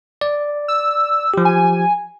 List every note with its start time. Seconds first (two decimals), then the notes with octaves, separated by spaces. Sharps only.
0.21 D5
0.68 E6
1.34 F3 G4
1.45 G#5